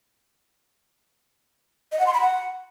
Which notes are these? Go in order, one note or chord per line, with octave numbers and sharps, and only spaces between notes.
D#5
F#5
C6
B5
F#5